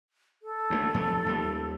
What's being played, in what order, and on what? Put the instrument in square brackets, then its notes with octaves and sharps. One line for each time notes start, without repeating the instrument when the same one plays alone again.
[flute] A4
[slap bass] D2 F#3 A3
F2 A3
D#2 G3